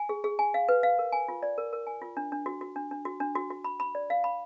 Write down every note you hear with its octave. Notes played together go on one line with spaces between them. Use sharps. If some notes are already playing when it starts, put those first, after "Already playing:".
Already playing: G#5
G#4
G#4
G#5
F5
B4
F5
A#4
G#5
F4
D5
A#4
A#4
G#5
F4
D4
D4
F#4
F#4
D4
D4
F#4
D4
F#4
F#4
B5
B5
D5
F5
B5